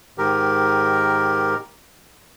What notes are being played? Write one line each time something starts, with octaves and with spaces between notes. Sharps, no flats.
G#2 D#3 G4 A#4